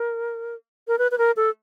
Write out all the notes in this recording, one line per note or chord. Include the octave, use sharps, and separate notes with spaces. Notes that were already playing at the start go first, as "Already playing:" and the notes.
Already playing: A#4
A#4
B4
B4
A#4
A4